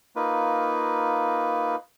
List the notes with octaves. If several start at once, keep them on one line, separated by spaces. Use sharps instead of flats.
A#3 D#4 F4 B4